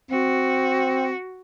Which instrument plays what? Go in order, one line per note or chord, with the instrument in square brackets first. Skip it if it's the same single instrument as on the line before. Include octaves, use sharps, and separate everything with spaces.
[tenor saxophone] C4 [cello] F#4